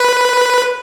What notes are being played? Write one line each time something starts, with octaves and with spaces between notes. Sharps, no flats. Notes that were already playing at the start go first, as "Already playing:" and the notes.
Already playing: B4